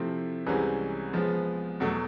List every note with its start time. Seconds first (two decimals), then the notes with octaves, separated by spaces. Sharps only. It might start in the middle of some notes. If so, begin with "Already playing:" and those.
Already playing: C3 F3 A3 C4 E4
0.46 C2 C3 E3 G#3 C#4
1.13 F3 G#3 B3
1.80 E2 B2 F#3 A3